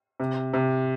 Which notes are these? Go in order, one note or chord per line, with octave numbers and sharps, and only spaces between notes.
C3
C3